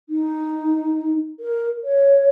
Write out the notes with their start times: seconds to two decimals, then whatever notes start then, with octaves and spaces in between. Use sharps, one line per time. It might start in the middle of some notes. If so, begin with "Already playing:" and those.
0.09 D#4
1.40 A#4
1.84 C#5